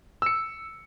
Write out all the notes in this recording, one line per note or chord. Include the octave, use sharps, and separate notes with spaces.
E6 C#7